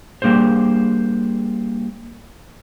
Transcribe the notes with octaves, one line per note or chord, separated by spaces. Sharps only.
G3 A#3 D4 G#4 C5